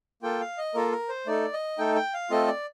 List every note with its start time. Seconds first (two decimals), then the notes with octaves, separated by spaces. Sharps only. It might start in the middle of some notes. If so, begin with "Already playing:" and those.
0.22 A#3 F4 A4 G5
0.41 F5
0.58 D#5
0.74 A#3 F4 A4 A#4
0.92 A#4
1.09 C5
1.27 A3 D#4 A4 D5
1.53 D#5
1.78 A3 D#4 A4 G5
1.95 G5
2.14 F5
2.30 A3 C4 F4 A4 D#5
2.48 D5